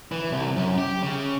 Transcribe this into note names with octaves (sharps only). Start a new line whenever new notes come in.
E3
C2
F#2
G4
C#3